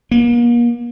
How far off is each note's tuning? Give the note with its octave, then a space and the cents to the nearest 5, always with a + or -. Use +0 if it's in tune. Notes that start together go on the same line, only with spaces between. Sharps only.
A#3 +40